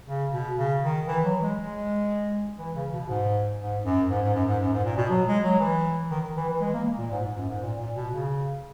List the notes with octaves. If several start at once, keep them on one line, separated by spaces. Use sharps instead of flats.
C#3
B2
C#3
D#3
E3
F#3
G#3
G#3
E3
C#3
B2
G#2
G#2
F#2
G#2
G#2
F#2
G#2
F#2
G#2
A#2
B2
F#3
G#3
F#3
E3
D#3
E3
E3
G#3
A#3
A#2
G#2
G#2
F#2
G#2
A#2
A#2
B2
C#3